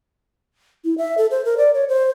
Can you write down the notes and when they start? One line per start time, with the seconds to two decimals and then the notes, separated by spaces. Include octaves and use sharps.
0.85 E4
0.98 E5
1.18 A4
1.31 C5
1.45 A#4
1.58 D5
1.74 C#5
1.89 C5